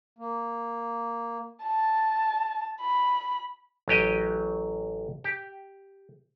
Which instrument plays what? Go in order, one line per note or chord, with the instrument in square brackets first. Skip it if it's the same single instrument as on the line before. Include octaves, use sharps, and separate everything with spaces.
[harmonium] A#3
[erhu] A5
B5
[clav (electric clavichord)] A1 F#3 G4 D#5
G4